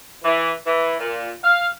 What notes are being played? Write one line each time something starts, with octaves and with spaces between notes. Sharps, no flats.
E3
E3
A#2
F5